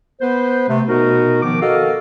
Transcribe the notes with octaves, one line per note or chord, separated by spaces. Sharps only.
B3 B4 C5
C3 A3
B2 B3 D#4 F#4 A#4
D#3 F3 B3 D6
F#4 A4 A#4 D#5 F5